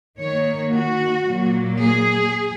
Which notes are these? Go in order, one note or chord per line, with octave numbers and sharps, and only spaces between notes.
D#3 A#3 C#5
F#4
A#2 F#3 A#3
G#4